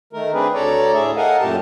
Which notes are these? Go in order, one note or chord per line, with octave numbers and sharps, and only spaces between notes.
D#3 A3 A#4
C4 D4 G#4 B4
D2 A4 C#5 D5 A#5
A2 G#4 E5
A4 A#4 D#5 F5 F#5 G#5
F#2 A#2 A3 G4 A5